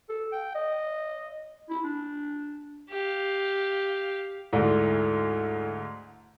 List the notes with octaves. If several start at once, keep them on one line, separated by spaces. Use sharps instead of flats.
A4
G5
D#5
E4
D4
G4 F5
D2 G#2 E4 A4 D5